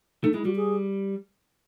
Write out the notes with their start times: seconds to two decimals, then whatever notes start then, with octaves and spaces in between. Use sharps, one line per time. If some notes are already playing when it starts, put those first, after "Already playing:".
0.23 A3 D#4
0.34 G#3 E4
0.45 G3 F#4
0.56 G#4